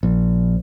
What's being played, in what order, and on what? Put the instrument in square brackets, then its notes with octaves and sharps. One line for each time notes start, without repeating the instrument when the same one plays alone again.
[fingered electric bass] A#1